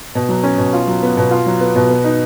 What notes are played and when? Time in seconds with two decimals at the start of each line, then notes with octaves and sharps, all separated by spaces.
0.15 B2
0.29 F#3
0.43 C#4
0.58 B2
0.73 F4
0.87 F#3
1.03 B3
1.17 B2
1.31 F4
1.46 F#3
1.61 B3
1.76 B2
1.90 B3
2.04 D#4